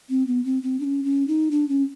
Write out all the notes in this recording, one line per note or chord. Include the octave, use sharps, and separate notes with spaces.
C4
B3
C4
C4
D4
C#4
C#4
D#4
D4
C#4